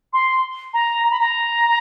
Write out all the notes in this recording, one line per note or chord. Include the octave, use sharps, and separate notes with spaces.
C6
A#5
A#5
B5
A#5